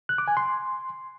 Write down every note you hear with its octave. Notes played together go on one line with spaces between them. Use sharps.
F#6
D6
G#5
C6